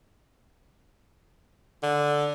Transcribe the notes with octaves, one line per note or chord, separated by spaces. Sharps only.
D3